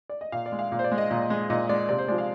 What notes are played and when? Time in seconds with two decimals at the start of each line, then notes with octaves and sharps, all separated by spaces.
0.10 D5
0.21 D#5
0.32 A#2 F5
0.46 D5
0.52 G#3
0.59 F5
0.72 A#2
0.79 C5
0.84 D5
0.92 G#3
0.98 D#5
1.11 A#2
1.30 G#3
1.50 A#2 D#5
1.69 G#3 D5
1.89 C3 D5
1.99 C5
2.08 F3 G#3 D5
2.18 F5